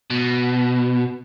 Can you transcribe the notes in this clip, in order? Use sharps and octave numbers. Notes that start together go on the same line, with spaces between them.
B2